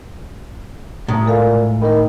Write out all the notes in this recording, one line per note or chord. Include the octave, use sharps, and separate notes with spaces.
A2 A#5 D#6
A#2 G#3 A4 F5
D#3 A#4 B5